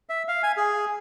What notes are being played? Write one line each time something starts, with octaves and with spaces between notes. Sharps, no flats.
E5
F5
G#5
G#4